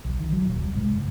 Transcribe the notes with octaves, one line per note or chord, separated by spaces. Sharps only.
B1
D#3
F#3
D#1
C2
G#2
F#1